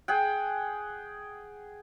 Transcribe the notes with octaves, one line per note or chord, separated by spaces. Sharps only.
G#4 F#5 G5